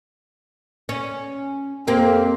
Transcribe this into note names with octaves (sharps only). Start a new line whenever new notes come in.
C#4
F2 A#3 C4 G4